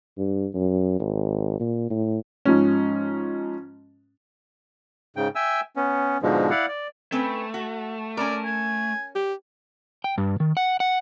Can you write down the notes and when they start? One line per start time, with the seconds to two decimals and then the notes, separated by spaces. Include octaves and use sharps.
0.18 G2
0.54 F#2
1.00 G#1
1.60 A#2
1.90 A2
2.45 G#2 F3 C#4
5.16 G#2 C#3 G5
5.35 E5 G5 G#5 E6
5.76 B3 C#4
6.22 G#2 B2 D3 F3 G#3
6.50 E4 D5 F5 F#5
6.68 D5
7.12 A3 C4 C#4 B4
7.54 F#4
8.17 C#4 A#4 D5
8.45 G#5
9.15 G4
10.04 G5
10.18 G2
10.40 D#3
10.57 F#5
10.80 F#5